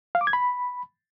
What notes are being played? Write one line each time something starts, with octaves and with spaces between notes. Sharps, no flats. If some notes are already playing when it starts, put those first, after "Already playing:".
F5
D6
G#6
B5